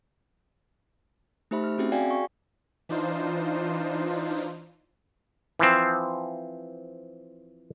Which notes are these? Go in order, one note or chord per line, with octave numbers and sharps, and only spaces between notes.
A3 D#4 G4 C5 E5 B5
F6
C4 C#4 F#4 G#4 E5
F#4 G#4 D5 F5 G5 G#5
C#6
E3 D4 D#4 F4 C5
E3 F3 C4